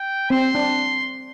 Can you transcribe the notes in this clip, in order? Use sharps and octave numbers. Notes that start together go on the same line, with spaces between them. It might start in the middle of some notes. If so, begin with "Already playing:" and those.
Already playing: G5
C4 C6
D4